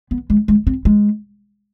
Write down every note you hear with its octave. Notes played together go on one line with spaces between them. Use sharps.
B3
G#3
G#3
C4
G#3